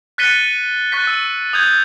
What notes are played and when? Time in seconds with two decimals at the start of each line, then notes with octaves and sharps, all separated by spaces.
0.18 F#6 A6 B6 C#7 D#7 G7
0.92 C#6 F#6 A6 B6
1.07 E6
1.53 D#6 G6 G#6